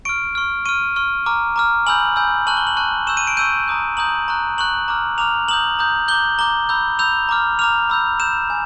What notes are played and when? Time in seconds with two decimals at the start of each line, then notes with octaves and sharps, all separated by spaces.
0.05 C#6 F6 D7
0.35 C#6 F6
0.66 C#6 F6 D#7
0.96 C#6 F6
1.26 A#5 D6 F6
1.56 A#5 D6 F6
1.87 G#5 B5 E6 G6 F#7
2.16 G#5 B5 E6 G6
2.47 A5 C#6 F#6 F#7
2.57 G7
2.67 F#7
2.77 A5 C#6 F#6
3.07 C#6 E6 G6 E7
3.17 D#7
3.27 D7
3.37 C#6 E6 G6 D#7
3.68 A#5 D#6 G6
3.97 A#5 D#6 G6 F#7
4.28 A#5 C#6 F#6
4.58 A#5 C#6 F#6 F#7
4.88 A#5 D6 F6
5.18 A#5 D6 F6 F7
5.48 A#5 D#6 G6 F#7
5.79 A#5 D#6 G6
6.08 A#5 D6 G6 G7
6.39 A#5 D6 G6 G7
6.69 B5 E6 G6
6.99 B5 E6 G6 F7
7.29 A#5 D6 F6
7.59 A#5 D6 F6 F7
7.90 B5 E6 G6
8.20 B5 E6 G6 E7
8.50 G#5